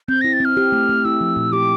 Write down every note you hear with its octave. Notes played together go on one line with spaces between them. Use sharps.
C4 G6
E4 A#6
A6
C4 F6
G4
A3
A3
E4 E6
F3
A#2
G4 D6